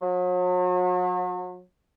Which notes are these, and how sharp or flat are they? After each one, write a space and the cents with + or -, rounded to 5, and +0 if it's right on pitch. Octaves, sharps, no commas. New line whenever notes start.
F#3 -40